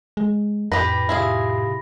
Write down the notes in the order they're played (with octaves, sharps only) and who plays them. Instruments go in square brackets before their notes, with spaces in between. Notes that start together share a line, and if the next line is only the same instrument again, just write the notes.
[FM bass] G#3
[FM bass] F2 [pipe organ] A2 [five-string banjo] G4 B4 [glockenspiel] B5 A#6
[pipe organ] A2 C3 [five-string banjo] E4 F4 G#4